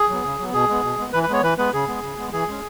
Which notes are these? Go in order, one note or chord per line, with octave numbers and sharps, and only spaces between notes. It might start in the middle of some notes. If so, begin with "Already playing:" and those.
Already playing: G#4
F#3 B3
C#3
F#3 B3
B2 G#4
G#3 B3
B2
G#3 B3
E3 B4
B4
G#3 B3 C#5
E3 B4
G#3 B3 B4
C#3 G#4
G#3 B3
C#3
G#3 B3
E3 G#4
G#3 C#4